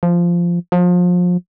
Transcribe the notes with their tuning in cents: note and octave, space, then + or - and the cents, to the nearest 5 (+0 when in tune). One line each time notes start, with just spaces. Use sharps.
F3 -10
F3 +30